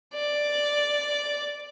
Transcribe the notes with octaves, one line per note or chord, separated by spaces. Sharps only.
D5